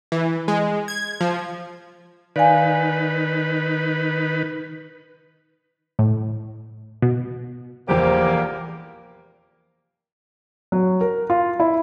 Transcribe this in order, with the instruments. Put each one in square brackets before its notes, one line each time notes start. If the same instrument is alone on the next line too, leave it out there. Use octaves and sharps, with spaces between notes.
[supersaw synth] E3
G#3
G#6
F3
[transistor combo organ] D#3 B4 [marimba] D5 F5 G#5
[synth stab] A2
B2
[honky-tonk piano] F1 A#1 E2 [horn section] G3 A#3 [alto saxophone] G4 [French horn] C5
[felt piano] F#3
A#4
F4
E4